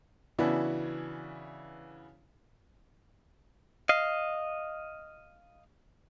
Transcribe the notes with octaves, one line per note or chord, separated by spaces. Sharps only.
C#3 E3 B3 D4 E4 F#4
D#5 F5